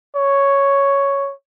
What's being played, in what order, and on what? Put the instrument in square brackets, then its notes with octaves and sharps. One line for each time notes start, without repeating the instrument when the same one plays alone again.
[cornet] C#5